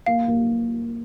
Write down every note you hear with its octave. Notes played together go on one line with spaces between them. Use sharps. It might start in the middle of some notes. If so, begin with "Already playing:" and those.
A#3 F5
A#3